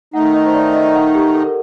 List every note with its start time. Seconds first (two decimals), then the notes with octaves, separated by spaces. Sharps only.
0.13 D#3 A3 D#4 F#5
0.34 D#5
0.46 C5
0.54 D5
0.73 D#5
0.94 F#5
1.15 G4
1.34 A4
1.44 A#4